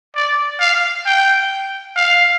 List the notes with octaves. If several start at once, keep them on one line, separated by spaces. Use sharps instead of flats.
D5
F5
G5
F5